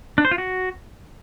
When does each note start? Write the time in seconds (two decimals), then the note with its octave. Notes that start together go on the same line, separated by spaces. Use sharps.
0.18 D4
0.25 C5
0.31 F4
0.38 F#4